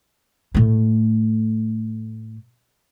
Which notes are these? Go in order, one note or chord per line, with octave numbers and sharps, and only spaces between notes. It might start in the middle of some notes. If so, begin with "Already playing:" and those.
A2 A3